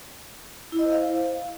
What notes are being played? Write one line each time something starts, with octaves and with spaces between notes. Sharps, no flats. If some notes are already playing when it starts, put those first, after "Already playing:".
E4
D#5
C5
F5